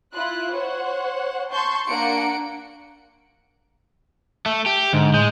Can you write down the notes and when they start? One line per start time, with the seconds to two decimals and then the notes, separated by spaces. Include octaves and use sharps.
0.13 E4 F4 F#6
0.53 C5 C#5 F#5
1.52 A5 C6 C#6 G6
1.88 A#3 D4 F#5 C#7 D7
4.46 A3
4.66 G4
4.93 G#2 D3
5.14 A2 G#3 G6